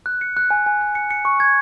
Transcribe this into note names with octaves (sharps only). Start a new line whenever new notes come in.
F#6
C#7
F#6
G#5
G#5
F#6
C#7
C#7
C#6
G#6